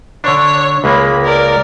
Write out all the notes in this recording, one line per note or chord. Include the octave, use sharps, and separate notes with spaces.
D3 D4 C#5
C#2 G#3 A#3 B5
A#4 D5